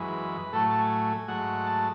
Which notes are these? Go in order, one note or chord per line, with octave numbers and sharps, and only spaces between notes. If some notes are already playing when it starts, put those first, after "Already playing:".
Already playing: F#2 E3 G#3 B4
A2 F#3 A3 A4
A5
G#5
G#2 F#3 A3 F#5
A5